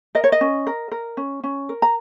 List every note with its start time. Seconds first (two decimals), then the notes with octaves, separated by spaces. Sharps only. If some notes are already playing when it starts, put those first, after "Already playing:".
0.15 A#4 D#5
0.24 C#5
0.32 D#5
0.41 C#4
0.67 A#4
0.92 A#4
1.17 C#4
1.43 C#4
1.69 A#4
1.82 A#5